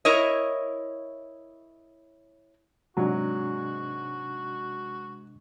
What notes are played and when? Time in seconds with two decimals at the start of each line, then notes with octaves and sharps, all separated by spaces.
0.05 E4 A#4 C#5 D#5
2.97 G#2 C3 F#3 D4 F#4